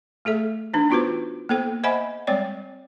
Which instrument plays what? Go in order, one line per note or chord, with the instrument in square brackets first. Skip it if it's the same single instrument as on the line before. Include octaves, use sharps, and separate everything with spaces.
[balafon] A3 G#4 A4 E5
E3 D4 D#4
B3 D#4 F4 F#4 B4 C5
A#3 B3 A4 C5 G5
C5 D#5 E5 F#5 G#5 B5
G3 G#3 C4 C#5 D5 G5